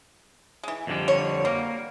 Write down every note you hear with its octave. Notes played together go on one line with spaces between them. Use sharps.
E3 G#3
F2 D3 G3
C#5
F#3 G3 A#3